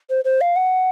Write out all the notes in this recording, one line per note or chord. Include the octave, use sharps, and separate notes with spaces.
C5
C5
F5
F#5